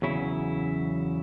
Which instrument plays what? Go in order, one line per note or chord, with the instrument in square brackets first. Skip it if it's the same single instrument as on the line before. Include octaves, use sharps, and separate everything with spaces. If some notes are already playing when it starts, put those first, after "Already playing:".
[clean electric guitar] E2 C#3 F#3 C#4 E4